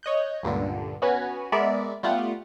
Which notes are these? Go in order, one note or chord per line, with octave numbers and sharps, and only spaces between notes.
C#5 D#5 F#6 G6
C#2 G2 A#2 D3
B3 C#4 F#4 B4 C#5 G#5
G#3 B3 A#4 D5 E5
G3 A3 B3 F4 G4 F#5